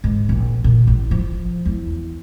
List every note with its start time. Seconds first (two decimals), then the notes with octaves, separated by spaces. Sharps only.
0.04 G#2
0.29 A#1
0.64 A#2
0.87 A1
1.11 F3
1.65 E2